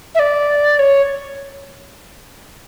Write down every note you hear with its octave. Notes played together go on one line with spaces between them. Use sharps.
E5
D5
C#5